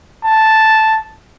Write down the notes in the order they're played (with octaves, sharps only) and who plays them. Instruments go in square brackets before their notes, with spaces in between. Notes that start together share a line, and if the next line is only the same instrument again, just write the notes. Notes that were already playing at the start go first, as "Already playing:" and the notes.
[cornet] A5